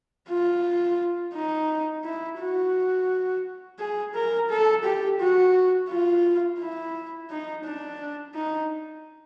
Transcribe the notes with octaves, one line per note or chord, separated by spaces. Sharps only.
F4
D#4
E4
F#4
G#4
A#4
A4
G4
F#4
F4
E4
D#4
D4
D#4